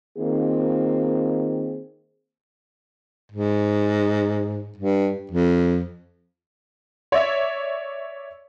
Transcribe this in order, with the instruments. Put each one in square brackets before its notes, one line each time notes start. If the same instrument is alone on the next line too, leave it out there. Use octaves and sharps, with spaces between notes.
[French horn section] D#3 A#3 C4 D#4 F4 G#4
[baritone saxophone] G#2
G2
F2
[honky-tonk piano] C#5 D5 E5